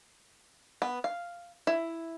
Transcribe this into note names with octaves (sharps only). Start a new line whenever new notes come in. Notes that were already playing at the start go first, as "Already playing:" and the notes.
B3
F5
E4